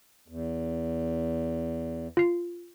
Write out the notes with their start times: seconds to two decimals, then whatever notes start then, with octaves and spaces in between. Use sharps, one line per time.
0.28 E2
2.17 F4 C7